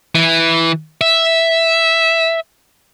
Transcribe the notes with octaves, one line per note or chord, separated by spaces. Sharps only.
E3
E5